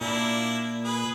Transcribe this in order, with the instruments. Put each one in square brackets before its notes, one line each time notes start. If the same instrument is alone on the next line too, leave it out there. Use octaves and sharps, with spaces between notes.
[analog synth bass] A#2 [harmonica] A#3 D4 E4
[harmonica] G#4 B4